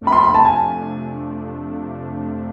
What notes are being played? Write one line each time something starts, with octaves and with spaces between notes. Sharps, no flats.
F2 C3 F3 A3 D4
B5
C6
B5
A5
G#5